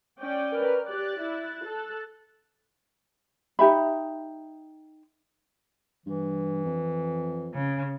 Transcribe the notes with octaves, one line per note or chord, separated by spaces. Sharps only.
C#4 D5 G5
A#4 B4 F6
G4 D5 F#6 A6
E4
A4
D#4 G4 E5 B5
G2 E3
F2
C#3